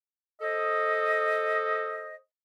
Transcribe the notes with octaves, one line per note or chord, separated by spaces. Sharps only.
A4 C5 D#5